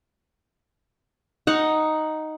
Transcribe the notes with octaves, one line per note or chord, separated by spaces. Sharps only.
D#4 F#5